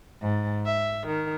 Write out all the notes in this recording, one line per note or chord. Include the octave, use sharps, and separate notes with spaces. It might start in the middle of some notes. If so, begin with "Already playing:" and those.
G#2
E5
D#3